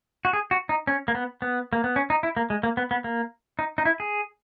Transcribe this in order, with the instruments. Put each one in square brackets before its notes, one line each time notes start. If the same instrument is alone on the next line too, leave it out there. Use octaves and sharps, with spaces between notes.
[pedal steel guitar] F#4
G#4
F#4
D#4
C#4
A#3
B3
B3
A#3
B3
C#4
D#4
E4
A#3
G#3
A#3
B3
B3
A#3
D#4
D#4
E4
G#4